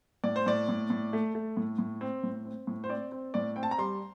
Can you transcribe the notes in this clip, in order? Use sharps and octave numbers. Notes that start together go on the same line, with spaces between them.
A2 D5
C5
A2 D5
A2
A2
A3
A3
A2
A2
C4
A2
C4
A2
C5
C4 D5
C4
A2 D5
C4 G5
A5
A#5
G3 C6